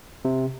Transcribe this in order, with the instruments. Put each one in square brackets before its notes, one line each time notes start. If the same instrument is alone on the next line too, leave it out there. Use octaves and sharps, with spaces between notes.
[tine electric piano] C3